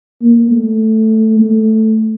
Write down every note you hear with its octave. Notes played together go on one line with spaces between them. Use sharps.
A#3
A3
A3